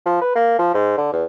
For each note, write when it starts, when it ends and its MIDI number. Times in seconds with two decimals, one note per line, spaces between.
0.06 0.18 53
0.21 0.32 71
0.35 0.56 58
0.59 0.74 53
0.74 0.96 44
0.97 1.11 50
1.13 1.24 40